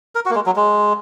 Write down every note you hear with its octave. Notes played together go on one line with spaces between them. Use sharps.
A#4
F#4
A#3
G#3
F#3
G#3